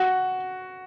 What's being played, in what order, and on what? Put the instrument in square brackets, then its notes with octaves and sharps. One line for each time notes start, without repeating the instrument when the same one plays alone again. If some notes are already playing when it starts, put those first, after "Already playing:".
Already playing: [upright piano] F#4